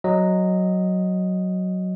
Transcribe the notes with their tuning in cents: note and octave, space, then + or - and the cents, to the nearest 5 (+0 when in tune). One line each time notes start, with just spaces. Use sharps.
F#3 +0 D#5 +0